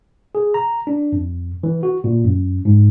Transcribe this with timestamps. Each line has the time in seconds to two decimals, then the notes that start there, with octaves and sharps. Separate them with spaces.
0.35 G#4
0.54 A#5
0.87 D4
1.12 F2
1.63 E3
1.83 F#4
2.04 A#2
2.24 F#2
2.65 G#2